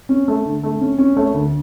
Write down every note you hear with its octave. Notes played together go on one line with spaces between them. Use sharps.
C#4
A3
D3
A3
C#4
C#4
A3 C#5
D2